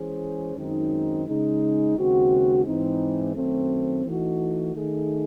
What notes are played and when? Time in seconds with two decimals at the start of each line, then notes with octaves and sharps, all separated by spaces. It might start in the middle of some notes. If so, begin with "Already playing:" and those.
Already playing: E3 G#3 C#4 G#4 C5
0.56 F#2 D#3 G#3 C4 D#4
1.27 C#3 G#3 D#4
1.96 D#2 C#3 G#3 C4 F#4
2.65 G#2 E3 C4 D#4
3.35 F#2 D#3 F#3 A3 C4
4.05 E3 A3 D#4 F#4
4.74 D#3 A3 D#4 G#4